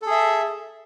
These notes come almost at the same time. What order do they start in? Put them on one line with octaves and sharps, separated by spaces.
A4 G#4 E5